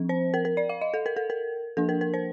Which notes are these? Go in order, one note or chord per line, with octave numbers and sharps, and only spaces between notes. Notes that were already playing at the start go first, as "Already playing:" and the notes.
Already playing: F3 C4
C5
A#4
A#4
D5
F5
D#5
A4
A#4
A4
A#4
F3 A#3 D4 A4
A#4
A#4
C5